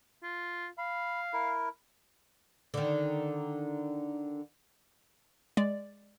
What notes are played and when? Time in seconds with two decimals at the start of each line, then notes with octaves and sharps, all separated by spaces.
0.23 F4
0.78 F5 B5
1.33 E4 A#4
2.74 D3 D#3
5.57 G#3 D5